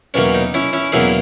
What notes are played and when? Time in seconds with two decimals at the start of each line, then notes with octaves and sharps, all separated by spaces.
0.14 E2 B2 F#3 A#3 C#4
0.35 D#4
0.54 C#4 E4
0.73 C#4 E4
0.92 E2 B2 F#3 A#3 E4 G#4